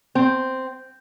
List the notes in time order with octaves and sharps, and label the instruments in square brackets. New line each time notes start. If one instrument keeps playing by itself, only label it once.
[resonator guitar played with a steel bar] C4